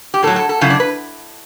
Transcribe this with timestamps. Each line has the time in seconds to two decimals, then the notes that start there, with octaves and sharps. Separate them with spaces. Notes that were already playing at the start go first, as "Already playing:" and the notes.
0.14 G4
0.23 A2 A4
0.27 F#3
0.36 A4
0.49 A4
0.61 F#2 C#3 E4
0.70 D4
0.80 B4